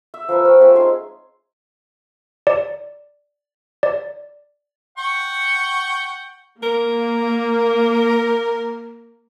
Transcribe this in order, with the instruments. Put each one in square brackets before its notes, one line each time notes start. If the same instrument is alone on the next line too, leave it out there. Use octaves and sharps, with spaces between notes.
[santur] E5
F3 A#4 B4 E6
A3 B4 F5 G5
C4 C#4 G#4 E5
G#3 D#4 G#5 C6
[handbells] D5
D5
[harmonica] F#5 G5 C#6
[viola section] A#3 [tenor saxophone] A#4